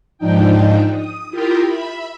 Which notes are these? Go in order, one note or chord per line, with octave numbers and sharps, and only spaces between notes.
G#2 F3 D4 D#4 G5
D#6
E4 F4 G4 A#4 G5 D#6
E5 B5